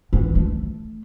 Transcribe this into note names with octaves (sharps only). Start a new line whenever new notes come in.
E3
A3